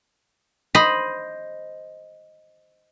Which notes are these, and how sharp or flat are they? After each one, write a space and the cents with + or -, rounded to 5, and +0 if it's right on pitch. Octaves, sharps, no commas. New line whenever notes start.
C5 +0 D#5 +0 B5 +0